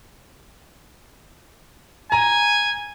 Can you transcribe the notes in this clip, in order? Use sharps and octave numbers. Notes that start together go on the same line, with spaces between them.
G#5 A#5